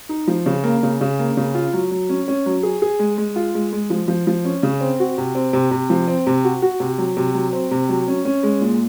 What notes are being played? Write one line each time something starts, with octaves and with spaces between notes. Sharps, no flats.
D#4
F3
C#3
A#3
C#3
C#3
A#3
C#3
F4
F#3
F#3
C#4
C#4
F#3
G#4
G#4
G#3
G#3
F4
G#3
G#3
F3
F3
F3
C#4
C#3
C4
F#4
C3
C4
C3
C3
F3
C4
C3
F#4
F#4
C3
F#3
C3
F#3
C4
C3
F#3
C#4
C#4
G#3
A#2